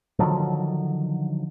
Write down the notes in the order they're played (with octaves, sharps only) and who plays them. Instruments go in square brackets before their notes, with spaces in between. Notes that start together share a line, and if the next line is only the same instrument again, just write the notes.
[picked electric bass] D3 D#3 F3 F#3